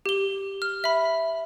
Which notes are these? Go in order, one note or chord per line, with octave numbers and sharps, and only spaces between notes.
G4 G7
F6
E5 B5